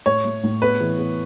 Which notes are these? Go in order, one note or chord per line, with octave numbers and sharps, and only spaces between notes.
A2 C#5
A3
A2
B3 B4
E3
B3